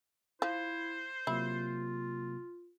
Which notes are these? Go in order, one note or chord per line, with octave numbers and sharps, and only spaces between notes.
F3 E4 C5
C3 F#3 A#3 E4 F4